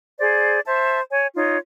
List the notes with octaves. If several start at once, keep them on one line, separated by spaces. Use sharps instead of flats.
G#4 C5 D5
C5 E5 A5
C#5 G#5
D#4 F4 C#5